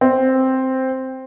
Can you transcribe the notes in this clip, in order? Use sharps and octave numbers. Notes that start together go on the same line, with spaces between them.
C4